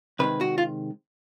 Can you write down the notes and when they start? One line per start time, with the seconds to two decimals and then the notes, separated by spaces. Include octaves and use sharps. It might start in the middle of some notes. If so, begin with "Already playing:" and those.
0.19 C3 D#3 G#3 B4
0.41 F#4
0.58 F4